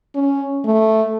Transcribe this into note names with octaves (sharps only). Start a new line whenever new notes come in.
C#4
A3